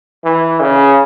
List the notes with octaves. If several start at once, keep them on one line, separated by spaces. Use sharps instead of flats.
E3
C#3